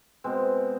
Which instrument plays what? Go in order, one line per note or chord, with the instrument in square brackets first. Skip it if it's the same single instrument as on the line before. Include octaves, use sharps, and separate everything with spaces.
[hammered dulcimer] B2 G#3 C4